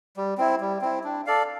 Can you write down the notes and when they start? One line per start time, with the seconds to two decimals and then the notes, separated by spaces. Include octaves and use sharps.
0.17 G3
0.38 C4 E4
0.61 G3
0.81 C4 E4
1.04 D4
1.26 A4 D5 F5